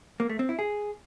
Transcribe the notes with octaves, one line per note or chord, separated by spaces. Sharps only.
A#3
A3
C4
E4
G#4